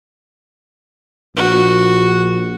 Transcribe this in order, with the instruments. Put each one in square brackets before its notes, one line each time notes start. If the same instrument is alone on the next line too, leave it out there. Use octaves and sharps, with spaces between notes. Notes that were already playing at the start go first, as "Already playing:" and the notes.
[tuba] A#1 [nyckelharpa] F#4